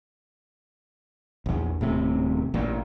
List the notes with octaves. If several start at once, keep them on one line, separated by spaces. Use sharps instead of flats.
A#1 E2
D#1 A2 C3
A1 A#2